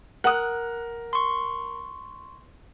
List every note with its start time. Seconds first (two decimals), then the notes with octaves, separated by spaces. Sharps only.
0.24 A#4 F#5 D#6 F#6
1.13 C6 C#6